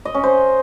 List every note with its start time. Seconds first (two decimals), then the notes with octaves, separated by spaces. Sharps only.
0.05 D#5
0.14 C#4
0.23 C5